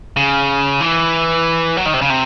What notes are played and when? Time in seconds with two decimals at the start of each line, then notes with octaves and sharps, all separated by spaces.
0.17 C#3
0.81 E3
1.77 F#3
1.86 D#3
1.94 C3
2.02 C#3
2.10 C3